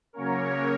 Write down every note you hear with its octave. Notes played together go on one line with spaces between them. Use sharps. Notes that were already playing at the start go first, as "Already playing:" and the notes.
C#3 F#3 A#3 C#4 A#4 C#5